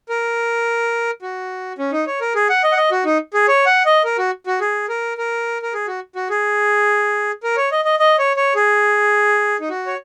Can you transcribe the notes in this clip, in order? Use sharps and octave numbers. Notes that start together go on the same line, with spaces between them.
A#4
F#4
C#4
D#4
C#5
A#4
G#4
F#5
D#5
F#5
D#5
F#4
D#4
G#4
C#5
F#5
D#5
A#4
F#4
F#4
G#4
A#4
A#4
A#4
G#4
F#4
F#4
G#4
A#4
C#5
D#5
D#5
D#5
C#5
C#5
G#4
D#4
F#4
C#5